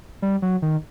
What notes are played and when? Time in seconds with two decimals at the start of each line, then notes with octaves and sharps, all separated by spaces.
0.22 G3
0.42 F#3
0.62 D#3